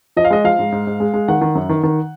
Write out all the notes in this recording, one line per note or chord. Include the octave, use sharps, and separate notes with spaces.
F3 D#5
F5
G#3 D#5
F3 F5
G#2
G#2
G#2
G#3
G#3
D#3 F#5
D#3
F#2
D#3
D#3